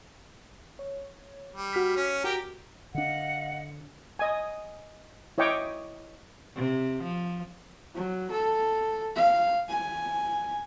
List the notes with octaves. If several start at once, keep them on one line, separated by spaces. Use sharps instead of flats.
C#5
G3
F#4 F6 B6
C#4
F#4 G4 A#4
D3 D4 D#5 F5 F#5
D#5 G#5
E4 C#5 D#5 G5 C#6 D6
C3
F3
F#3
A4
F5
G#5